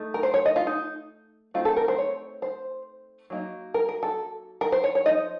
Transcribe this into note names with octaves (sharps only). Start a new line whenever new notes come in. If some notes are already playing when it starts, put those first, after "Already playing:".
Already playing: A3 D#4
A#4
C5
C#5
D#5
F4
D#4
A3 C4 D#4 F4
A4
A#4
C5
C#5
C5
F#3 A#3 D#4
A#4
A#4
A4
A#4
C5
C#5
C#5
F3 C4 D#4 D#5